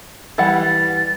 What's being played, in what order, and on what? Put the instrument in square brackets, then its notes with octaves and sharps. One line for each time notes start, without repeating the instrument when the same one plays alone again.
[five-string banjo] E3 G3 F#5 [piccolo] A6